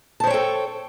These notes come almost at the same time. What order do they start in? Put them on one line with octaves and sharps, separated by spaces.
A5 C5 C#5 G5 A4